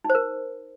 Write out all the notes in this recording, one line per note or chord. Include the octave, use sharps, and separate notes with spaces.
D#4
C5
A#4